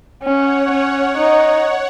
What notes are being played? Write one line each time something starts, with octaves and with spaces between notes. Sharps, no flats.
C#4 C#5 F#5
C#4
D#4